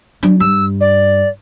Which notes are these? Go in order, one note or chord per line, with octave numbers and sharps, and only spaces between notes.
F#3 D4
G2 E6
D5